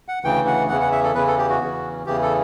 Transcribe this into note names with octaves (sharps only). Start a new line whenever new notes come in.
F#5
D2 C#3 E3 G5
F#5
E2 C#3 E3 F#5
F#5
E5
A4
E2 C#3 E3 B4
A4
G4
F#4
E2 C#3 E3
E2 C#3 E3 G4
A4